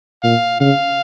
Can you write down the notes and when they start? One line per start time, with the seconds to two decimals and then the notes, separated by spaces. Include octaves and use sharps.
0.23 A#2 F5
0.60 C#3 F5